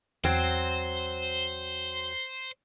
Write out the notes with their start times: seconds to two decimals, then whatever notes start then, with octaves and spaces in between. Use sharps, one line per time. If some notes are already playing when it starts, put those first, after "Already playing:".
0.24 E2 F#3 C4 C5